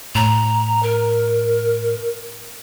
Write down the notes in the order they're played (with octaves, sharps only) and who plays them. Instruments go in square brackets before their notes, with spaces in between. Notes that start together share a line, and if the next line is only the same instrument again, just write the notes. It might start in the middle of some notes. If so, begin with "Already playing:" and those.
[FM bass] A2 [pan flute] A#5
[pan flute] A#4